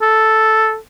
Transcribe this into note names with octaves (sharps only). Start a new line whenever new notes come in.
A4